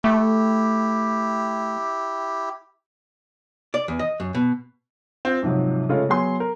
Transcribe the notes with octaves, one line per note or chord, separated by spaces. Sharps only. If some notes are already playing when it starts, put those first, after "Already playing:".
A3 E4 G4
D5
E2
D#5
F#2
B2
C4 F4
G#2 C3 F3 F#3
C#3 G#3 A3 C#4 F4
F#3 B3 G#4 C6
A#4